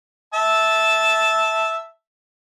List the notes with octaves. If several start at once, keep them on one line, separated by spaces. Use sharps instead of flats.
E5 A5